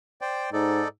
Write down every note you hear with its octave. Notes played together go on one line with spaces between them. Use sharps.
C5 D5 G5
G#2 D#4 A4 D5